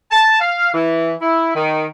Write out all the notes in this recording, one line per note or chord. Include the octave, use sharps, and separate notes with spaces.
A5
F5
E3
E4
D#3